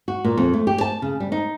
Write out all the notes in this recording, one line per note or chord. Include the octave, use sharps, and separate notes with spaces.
F#4
A#2
F2
A3
G4
A5
C#3
G3
D#4